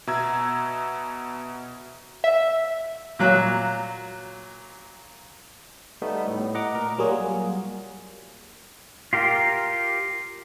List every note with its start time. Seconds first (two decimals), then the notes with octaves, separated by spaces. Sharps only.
0.07 B2 E5 A#5 E6 G#6
2.24 E5
3.19 A#2 F#3 F#6
6.02 G3 A3 B3 D#4
6.28 A2
6.55 D#5 F#5 A#5 D6
6.75 A#2 A#4 A#5
6.98 F#3 G3 A#3 F4 F#4 G#4
9.13 F4 G4 A#4